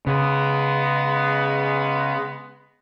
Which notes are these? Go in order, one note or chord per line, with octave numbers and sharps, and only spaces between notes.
C#3 G#3 B3